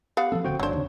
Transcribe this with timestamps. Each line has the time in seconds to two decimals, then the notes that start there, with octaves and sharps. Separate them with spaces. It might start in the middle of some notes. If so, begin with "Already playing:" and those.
0.17 B3 G4 F5 F#5
0.32 F3 G3 C4 A4
0.44 D1 D3 C4 F#4 C5 G5
0.60 G1 F#3 D4 C5 C#5
0.73 D#2 C#3